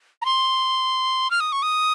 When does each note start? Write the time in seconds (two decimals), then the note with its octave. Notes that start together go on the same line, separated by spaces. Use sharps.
0.22 A#5
0.25 C6
1.31 F6
1.40 D#6
1.52 C#6
1.62 D#6